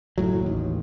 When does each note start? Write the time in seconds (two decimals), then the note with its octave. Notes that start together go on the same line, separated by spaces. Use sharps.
0.18 F#1 A2 F#3
0.42 A1 D#2